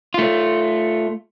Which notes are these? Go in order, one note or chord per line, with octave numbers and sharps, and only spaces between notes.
A3 F4